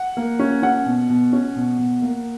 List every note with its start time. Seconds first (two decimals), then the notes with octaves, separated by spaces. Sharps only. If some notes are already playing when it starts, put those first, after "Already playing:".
Already playing: F#5
0.17 A#3
0.39 C#4
0.63 C#4 F#5
0.86 B2
1.10 B2
1.33 C#4
1.56 B2
1.79 B2
2.02 A#3